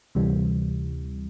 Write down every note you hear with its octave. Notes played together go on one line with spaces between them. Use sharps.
D2 C3 E3 G3